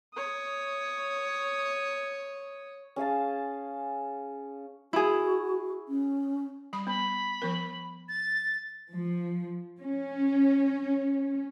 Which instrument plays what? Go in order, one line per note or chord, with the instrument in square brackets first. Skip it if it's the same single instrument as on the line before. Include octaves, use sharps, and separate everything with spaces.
[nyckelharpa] C#5 D#6
[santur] C#4 G#4 F5 A5
[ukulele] E4 G#4 [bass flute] F#4
[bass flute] C#4
[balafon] G3 B5
[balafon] B3 [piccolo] B5
[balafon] F3 B3 A#4
[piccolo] A6
[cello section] F3
C#4